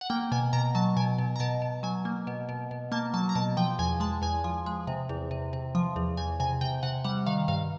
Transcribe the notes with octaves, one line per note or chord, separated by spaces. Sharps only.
F#5
A#3 G5
B2 G#5
B2 A#5
F#3 A5
B2 G#5
B2
A#5
B2 A5
B2
F#3 G#5
A#3
B2
B2
B2
A#3 A5
F#3 A5
A#5
B2 A5
F3 G5
E2 G#5
G#3 A5
E2 G#5
F3
G#3
C3
E2
C3
C3
F3
E2
E2 G#5
C3 G#5
C3 G5
C3 F#5
G3 F#5
D#3 F5
G2 F5